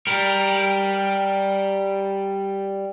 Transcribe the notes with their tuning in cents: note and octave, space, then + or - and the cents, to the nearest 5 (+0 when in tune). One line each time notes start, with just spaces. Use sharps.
G3 +0 A#4 +0